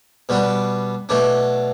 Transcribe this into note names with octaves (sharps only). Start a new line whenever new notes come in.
B2 G3 B3 D4
B2 F#3 A3 D4